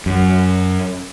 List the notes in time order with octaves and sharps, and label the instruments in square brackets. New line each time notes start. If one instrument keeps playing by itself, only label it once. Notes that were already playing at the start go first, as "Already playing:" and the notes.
[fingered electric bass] F#2